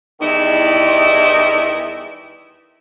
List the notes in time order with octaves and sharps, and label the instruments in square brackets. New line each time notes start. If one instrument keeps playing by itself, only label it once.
[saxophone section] E2 D#3 G3 D#4 E4